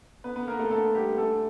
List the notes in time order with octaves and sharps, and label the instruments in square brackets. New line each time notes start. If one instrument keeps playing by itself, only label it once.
[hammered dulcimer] D3 [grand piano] B3 B4
[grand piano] B3 B4
[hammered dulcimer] D3 [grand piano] A#3 A#4
[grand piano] A3 A4
[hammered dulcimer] D3 [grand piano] A3 A4
[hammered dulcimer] D3 [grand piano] G3 G4
[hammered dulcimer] E3 [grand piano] A3 A4